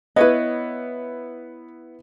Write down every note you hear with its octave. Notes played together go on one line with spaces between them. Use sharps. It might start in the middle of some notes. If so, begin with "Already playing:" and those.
B3 E4 B4 C#5 D#5